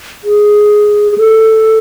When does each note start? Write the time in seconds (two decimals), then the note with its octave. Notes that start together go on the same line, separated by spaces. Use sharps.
0.24 G#4
1.12 G#4
1.18 A4